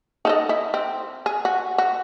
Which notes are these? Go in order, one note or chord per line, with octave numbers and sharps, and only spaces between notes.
D#4 A4 D#5
E4
C4
G#4
F#4
F#4